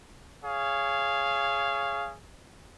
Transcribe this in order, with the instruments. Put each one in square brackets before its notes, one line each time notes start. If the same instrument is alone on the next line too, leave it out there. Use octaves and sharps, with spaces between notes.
[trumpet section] G#4 C#5 F5